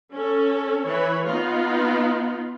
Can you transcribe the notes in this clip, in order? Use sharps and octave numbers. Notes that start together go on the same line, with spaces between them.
C#4 A4
E3 B4 C#5
B3 D#4 F4